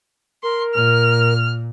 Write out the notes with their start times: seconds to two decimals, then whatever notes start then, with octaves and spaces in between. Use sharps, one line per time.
0.43 A#4 C6
0.74 A#2 F6